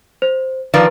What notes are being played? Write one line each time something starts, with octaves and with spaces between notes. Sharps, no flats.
C5
D#3 F3 B4 D5